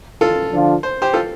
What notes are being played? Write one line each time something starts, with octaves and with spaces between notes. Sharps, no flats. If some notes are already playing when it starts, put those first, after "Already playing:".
F4 A4
D3 F3 D4 F4
C5
G4 C5
F4 A4